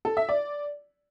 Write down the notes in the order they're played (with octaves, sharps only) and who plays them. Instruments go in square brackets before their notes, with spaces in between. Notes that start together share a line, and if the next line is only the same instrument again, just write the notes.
[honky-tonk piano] A4
E5
D5